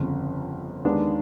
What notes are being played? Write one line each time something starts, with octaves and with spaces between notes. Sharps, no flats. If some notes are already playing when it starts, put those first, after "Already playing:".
Already playing: G1 F2 C#3
D#2 D#3 G#3 B3 D4